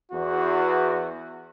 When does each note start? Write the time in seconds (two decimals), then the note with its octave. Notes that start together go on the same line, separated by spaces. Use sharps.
0.11 E2 F#4